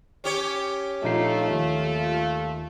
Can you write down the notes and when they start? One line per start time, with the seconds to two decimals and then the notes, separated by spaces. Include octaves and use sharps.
0.24 C#4 G4 C#5
1.03 A#1 A3 D#4 F4 C7
1.50 D#2